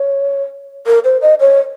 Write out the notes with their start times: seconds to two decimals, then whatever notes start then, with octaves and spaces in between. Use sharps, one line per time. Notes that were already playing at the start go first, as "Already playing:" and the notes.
Already playing: C#5
0.86 A#4
1.04 C5
1.22 D#5
1.40 C#5